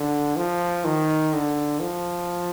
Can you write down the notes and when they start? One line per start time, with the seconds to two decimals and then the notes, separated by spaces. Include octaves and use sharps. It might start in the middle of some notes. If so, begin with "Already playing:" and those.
Already playing: D3
0.37 F3
0.85 D#3
1.34 D3
1.81 F3